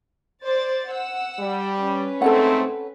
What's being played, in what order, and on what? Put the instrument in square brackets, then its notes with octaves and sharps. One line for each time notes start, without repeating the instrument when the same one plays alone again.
[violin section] C5 D5 A6
F#5 E6
[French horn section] G3
[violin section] C#4 B4
[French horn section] G#2 A3 C4 [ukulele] A4 C#5 F#5